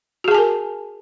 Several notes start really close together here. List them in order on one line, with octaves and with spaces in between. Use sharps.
F#4 G#4 A5 G#5 A#4